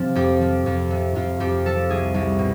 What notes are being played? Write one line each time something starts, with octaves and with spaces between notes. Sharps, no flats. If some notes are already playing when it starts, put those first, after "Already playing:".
Already playing: C3 F3 C4
F2 G4
F3
F2
C3
F2 F4
F2 G4
F3 A4
C2 G#4
C2
B2